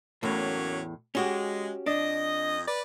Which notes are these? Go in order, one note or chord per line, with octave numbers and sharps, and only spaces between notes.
E2 A2 F#3 A#3 C#4
G#3 C#4 F#4 G4
F2 D4 D#5
B4 D5